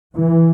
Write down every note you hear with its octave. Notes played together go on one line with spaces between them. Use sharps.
E3